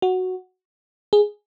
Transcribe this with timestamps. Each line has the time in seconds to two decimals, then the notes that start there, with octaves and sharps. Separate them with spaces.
0.02 F#4
1.13 G#4